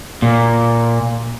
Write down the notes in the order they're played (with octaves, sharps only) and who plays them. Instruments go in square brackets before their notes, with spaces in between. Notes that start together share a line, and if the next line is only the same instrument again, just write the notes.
[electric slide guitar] A#2